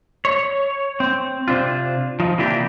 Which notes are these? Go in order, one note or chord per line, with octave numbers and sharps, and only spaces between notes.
C#5
C4
C3 C4 D4 F4
F3 D#4
C3 E3 A#3 D4 F4 G4